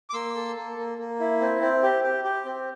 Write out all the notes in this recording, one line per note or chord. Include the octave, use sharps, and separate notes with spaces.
D6
A#3 C6 E6
A4
A#3
A#3
A#3
E4
C4
C4
G4
G4
G4
C4